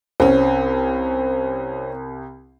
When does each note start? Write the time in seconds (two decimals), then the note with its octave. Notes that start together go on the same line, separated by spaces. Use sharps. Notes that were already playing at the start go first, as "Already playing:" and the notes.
0.20 C2 C4 C#4